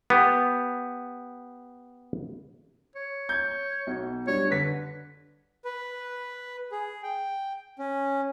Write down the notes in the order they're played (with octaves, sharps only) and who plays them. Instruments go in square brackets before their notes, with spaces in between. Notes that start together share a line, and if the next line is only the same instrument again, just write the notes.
[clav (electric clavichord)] B3 G4
[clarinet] C#5
[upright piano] G6 G#6
B1
[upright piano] G3 D4 [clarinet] C#5
[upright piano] D3 B6 [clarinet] B4
[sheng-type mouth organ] B4
G#4
G5
C#4